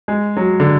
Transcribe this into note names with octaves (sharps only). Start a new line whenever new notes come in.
G#3
F#3
D3